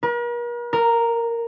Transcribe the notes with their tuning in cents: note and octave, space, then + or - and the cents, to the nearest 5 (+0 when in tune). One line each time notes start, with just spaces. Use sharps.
A#4 +45
A#4 -5